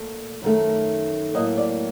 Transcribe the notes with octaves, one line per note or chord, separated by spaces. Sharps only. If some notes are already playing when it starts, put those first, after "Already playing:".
Already playing: A#2 A3
F#2 D#3 A3
A2 F#3 A#3 D#5
D5